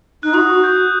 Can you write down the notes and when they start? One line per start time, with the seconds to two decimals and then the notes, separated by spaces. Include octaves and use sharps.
0.23 D#4 F#6
0.34 F#4 D#6
0.64 G6